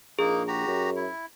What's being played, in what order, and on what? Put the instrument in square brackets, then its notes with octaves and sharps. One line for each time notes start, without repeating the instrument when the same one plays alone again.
[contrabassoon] A#1 [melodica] A#3 D#4 [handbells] G#4
[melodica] F#4 G4 A#5
[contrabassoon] F#2
[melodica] E4